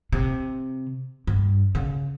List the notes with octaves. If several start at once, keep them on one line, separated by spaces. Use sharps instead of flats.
C3
G2
C#3